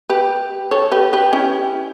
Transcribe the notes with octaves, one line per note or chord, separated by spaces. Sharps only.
G4 B4
A4 C#5
G4 B4
G4 B4
C#4 E4